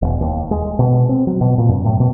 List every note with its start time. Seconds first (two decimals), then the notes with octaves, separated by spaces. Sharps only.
0.02 E1
0.21 D#2
0.51 G#3
0.79 B2
1.09 C4
1.27 F#3
1.41 B2
1.58 A#2
1.69 F#2
1.85 A2
2.00 B2